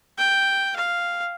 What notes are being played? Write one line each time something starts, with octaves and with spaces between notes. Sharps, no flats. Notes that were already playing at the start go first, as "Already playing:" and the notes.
G5
F5